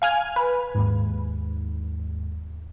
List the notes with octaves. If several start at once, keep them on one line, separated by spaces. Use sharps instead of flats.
F5 G#5 F6
B4
D#2 G#2